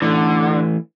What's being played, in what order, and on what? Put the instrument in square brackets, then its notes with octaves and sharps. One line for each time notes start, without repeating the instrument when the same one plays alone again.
[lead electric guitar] D3 [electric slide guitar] E3 A3